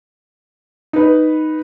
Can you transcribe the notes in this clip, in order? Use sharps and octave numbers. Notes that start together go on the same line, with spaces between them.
D#4 B4